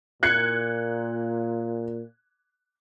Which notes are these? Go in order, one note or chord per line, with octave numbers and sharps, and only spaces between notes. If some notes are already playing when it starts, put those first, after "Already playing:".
A#2 F#6 G#6 C#7